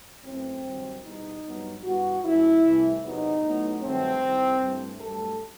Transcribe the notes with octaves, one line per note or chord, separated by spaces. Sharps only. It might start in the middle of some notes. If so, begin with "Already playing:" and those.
F#2 E3 A3 C4
G2 D#3 F#3
E2 B2 G3 D#4
G2 F#3 B3
G2 E3 B3 F#4
F#2 E3 A3 E4
C2 C3 E3 A3
E2 C3 F#3 B3 D#4
A2 F#3 B3
G2 D#3 F#3 A3 C4
C2 C3 D#3
G2 E3 A3
G2 F#3 A3 A4